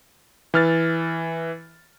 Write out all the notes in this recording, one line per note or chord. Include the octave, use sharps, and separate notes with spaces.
E3 F6 A6